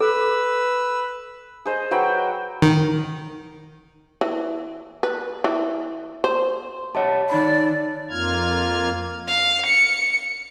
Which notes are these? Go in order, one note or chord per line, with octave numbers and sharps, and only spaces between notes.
A4 B4 E6
G#4 C5 D#5
F#3 F#4 B4 G5
D#3
E3
B4
E3
C5
G4 C#5 D#5 E5 F#5 A5
D#3 D#4 D5 B5
F2 A#3 F4 F6 G#6
F5
C#7